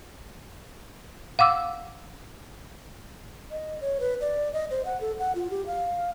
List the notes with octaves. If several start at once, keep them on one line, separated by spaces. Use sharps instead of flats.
F5 F#5 D6 E6
D#5
C#5
B4
D5
D#5
C5
F#5
A4
F#5
F4
G4
F5